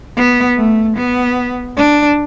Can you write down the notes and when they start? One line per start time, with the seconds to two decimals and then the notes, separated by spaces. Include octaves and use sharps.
0.16 B3
0.57 A3
0.96 B3
1.77 D4